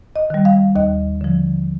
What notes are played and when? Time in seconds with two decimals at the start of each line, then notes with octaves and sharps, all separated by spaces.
0.16 D#5
0.30 D#3 G3
0.45 F5
0.76 D#2 D#5
1.21 D3 F3